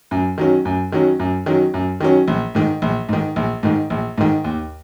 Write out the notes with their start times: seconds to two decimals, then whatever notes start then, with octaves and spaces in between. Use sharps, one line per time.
0.11 F#2
0.38 D#3 F#3 C#4
0.65 F#2
0.92 D#3 F#3 C#4
1.20 F#2
1.46 D#3 F#3 C#4
1.74 F#2
2.00 D#3 F#3 C#4
2.28 A#1
2.55 G#2 D#3
2.82 A#1
3.09 G#2 D#3
3.36 A#1
3.63 G#2 D#3
3.90 A#1
4.18 G#2 D#3
4.44 D#2